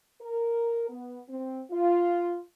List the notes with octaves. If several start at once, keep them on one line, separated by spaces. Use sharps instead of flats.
A#4
B3
C4
F4